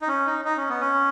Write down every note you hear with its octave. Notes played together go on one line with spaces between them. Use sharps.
D#4
C#4
D#4
D#4
C#4
B3
C#4